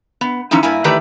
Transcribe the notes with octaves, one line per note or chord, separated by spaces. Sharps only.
B3
E3 F3 C#4 D#4 E4
G2 A#3 E4 G#5
D#3 E3 A3 G4 B4 D5